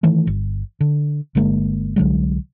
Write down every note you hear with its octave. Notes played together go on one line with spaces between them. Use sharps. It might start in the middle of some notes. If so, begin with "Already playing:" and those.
D#3 E3 A3
G1
D3
G1 D3 G#3 A#3
C2 D3 F#3 G#3